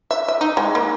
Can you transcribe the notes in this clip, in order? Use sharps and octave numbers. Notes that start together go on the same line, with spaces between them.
E5
E5
D#4
G#3
A#3